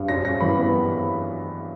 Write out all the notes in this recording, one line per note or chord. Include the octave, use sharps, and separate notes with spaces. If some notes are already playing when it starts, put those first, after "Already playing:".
Already playing: G2
F#2 A#6
F#2 A#6
E3 B5
B3